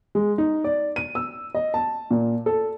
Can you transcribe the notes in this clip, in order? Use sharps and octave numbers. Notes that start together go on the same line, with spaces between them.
G#3
D#4
D5
D#7
E6
D#5
A5
A#2
A4